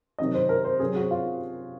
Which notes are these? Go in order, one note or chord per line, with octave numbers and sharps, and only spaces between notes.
C3 D#3 F#3 D#5
C5
A#4
C5
C3 F#3 C4 G#4
F#4
F4